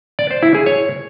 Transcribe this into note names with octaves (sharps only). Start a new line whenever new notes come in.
D5
C5
E4
G#4
C#5